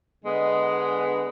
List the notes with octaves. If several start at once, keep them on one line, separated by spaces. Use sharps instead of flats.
D3 G#3 B3